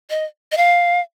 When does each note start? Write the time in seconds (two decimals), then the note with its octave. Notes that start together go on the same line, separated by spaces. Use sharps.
0.10 D#5
0.52 D#5
0.57 F5